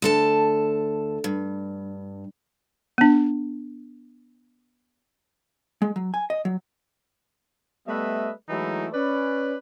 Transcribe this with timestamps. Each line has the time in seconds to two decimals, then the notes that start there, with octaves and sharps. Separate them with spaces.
0.02 D2 A4 A5
1.24 G2
2.98 B3 D4
5.82 G#3
5.96 F#3
6.14 G#5
6.30 D#5
6.45 F#3
7.87 G3 A3 B3 B4 D#5 E5
8.49 E3 F#3 G#3 A3 D#4 E4
8.93 C#4 B4 D5